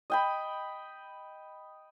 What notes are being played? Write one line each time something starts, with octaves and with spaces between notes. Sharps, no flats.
D#5 G5 B5